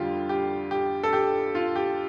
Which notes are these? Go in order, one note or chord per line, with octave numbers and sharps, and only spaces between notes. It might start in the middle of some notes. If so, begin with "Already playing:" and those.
Already playing: F2 D3 G3 F4 G4
G4
G4
A4
G4
F4
G4